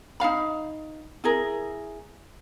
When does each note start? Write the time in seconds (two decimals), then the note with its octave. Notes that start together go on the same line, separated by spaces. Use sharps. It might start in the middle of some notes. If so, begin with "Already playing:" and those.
0.20 D#4 F4 F5 B5
1.24 E4 G#4 A#4